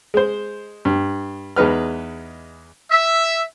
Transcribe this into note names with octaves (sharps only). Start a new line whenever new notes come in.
G#3 C5
G2
E2 G#3 D#4 B4 F6
E5